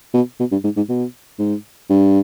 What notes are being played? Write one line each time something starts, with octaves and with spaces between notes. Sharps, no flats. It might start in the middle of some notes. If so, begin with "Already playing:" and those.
B2
B2
G2
G#2
G#2
B2
G#2
G2